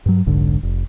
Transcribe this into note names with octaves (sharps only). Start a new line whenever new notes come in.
G2 F#3
F1 B1 G#2 D3
F1